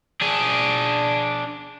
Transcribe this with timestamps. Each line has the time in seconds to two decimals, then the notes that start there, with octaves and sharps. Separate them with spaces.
0.22 D4 G#4